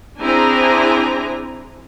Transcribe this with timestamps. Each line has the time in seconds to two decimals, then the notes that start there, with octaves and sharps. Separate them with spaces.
0.22 C4 D4 E4 G#4 G#5 A#5